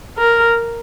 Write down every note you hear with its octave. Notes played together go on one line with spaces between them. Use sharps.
A#4